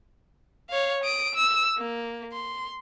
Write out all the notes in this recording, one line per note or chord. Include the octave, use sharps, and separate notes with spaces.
C#5 F5
D#6 D7
E6
A#3
C6